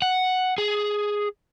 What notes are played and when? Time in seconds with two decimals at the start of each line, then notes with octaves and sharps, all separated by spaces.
0.02 F#5
0.58 G#4